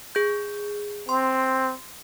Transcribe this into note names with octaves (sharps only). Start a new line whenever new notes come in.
G#4 G6
C4 C6